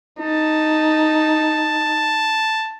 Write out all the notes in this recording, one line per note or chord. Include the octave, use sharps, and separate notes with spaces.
D#4 A5